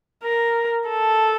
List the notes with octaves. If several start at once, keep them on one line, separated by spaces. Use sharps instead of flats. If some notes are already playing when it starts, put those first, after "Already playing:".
A#4
A4